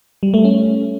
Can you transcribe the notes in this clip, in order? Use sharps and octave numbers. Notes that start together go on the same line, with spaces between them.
G3
A3
C#4